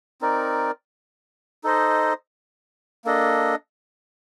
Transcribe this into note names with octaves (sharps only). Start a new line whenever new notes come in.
C4 D#4 A#4 D5
D#4 A4 C5 D#5
A#3 D4 A4 D#5